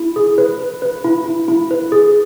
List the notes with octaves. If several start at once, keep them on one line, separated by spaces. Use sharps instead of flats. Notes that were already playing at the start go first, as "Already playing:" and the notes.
Already playing: E4
G#4
B4
B4
B4
E4
E4
E4
B4
G#4